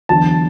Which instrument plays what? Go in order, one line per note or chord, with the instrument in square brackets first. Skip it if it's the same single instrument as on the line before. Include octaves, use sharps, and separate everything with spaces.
[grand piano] E2 D3 F#3 A5